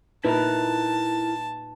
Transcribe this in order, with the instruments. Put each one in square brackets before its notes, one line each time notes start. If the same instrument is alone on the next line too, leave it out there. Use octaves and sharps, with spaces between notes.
[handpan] A#2 D#4 B4 [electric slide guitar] E4 A#4 A#5 [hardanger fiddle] A5